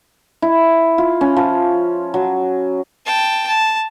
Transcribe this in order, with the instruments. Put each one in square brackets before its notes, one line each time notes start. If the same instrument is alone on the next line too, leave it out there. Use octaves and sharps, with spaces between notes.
[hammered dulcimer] E4
F4
C#4
F3
F#3
[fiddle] G5 A5
A5